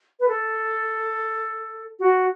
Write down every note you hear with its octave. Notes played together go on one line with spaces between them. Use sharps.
B4
A4
F#4